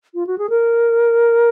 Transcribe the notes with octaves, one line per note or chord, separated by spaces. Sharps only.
F4
F#4
G#4
A#4